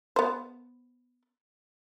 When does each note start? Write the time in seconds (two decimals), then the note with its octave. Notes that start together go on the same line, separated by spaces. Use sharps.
0.16 B3 C5